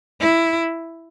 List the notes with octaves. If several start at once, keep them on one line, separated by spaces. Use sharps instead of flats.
E4